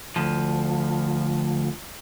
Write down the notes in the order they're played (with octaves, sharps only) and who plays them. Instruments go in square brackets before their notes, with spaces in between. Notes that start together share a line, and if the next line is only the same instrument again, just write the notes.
[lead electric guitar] D2 F3